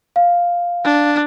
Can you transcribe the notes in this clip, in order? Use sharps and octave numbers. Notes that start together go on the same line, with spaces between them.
F5
D4